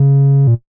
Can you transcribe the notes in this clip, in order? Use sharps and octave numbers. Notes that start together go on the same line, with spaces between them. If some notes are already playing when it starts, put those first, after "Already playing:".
Already playing: C#3
A#2